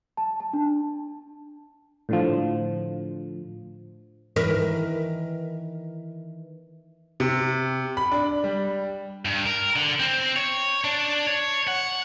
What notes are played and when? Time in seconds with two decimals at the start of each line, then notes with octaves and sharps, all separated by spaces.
0.17 A5
0.40 A5
0.53 D4
2.09 A2 D3 F3
4.36 D#3 E3 A#4 B4
7.20 C3
7.97 B5
8.12 D4
8.44 G3
9.25 G2
9.46 A#4
9.76 D3
10.00 C4
10.36 C#5
10.84 D4
11.27 C#5
11.68 F#5